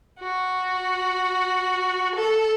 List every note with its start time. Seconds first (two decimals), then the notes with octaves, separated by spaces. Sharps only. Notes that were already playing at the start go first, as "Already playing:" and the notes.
0.19 F#4
2.14 A4